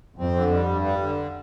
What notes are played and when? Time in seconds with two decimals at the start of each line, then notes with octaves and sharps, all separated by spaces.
0.18 F2 C4
0.36 D3
0.51 G3
0.68 G2
0.84 G3
1.01 D3